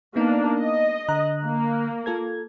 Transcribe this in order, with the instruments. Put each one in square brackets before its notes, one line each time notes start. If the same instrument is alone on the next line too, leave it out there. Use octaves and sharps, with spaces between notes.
[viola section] A#3 D4 [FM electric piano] B3 D#4
[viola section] D#5
[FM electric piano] D3 A#5 F#6
[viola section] A#3
[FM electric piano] F4 A4 G#6